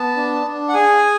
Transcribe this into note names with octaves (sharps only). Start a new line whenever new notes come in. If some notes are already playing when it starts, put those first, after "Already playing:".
Already playing: B3 A5
D4
D4
F#5
G#4 G#5